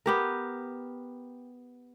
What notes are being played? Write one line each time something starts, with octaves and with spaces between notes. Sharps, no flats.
B3 G4 A#4